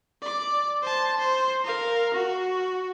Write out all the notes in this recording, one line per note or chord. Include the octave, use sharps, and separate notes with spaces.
D5 D6
C5 A5
C5
A#4 F5
F#4